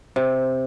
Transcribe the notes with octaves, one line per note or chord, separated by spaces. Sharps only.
C3